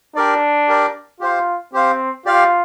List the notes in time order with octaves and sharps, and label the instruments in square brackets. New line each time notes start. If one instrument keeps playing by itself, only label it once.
[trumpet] D4 [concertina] G4 A#4 D5
[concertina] G4 A#4 D5
[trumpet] F4 [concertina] G4 C5 F5
[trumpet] C4 [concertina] G4 C5 F5
[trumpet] F4 [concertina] G4 D5 F5